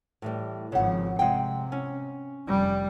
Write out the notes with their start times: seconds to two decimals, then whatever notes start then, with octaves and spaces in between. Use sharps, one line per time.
0.22 A2 E3 G3
0.72 G#1 C#3 F3 F#5
1.19 C3 G#3 F#5 G5
1.72 C#4
2.47 F1 G3